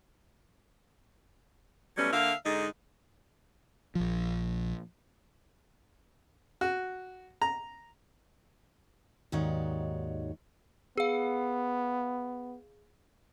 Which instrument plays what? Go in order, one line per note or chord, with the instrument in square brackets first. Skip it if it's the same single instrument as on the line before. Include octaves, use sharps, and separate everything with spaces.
[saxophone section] B2 F#3 G3 A3 B3 C#4
D3 A#3 E5 F5
G#2 D3 G#3 D#4
[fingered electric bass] A#1 F3
[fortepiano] F#4
A#5
[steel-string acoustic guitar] D#2 G#2 D#4 F#4 C#5 D5
[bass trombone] B3 [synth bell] G#4 F5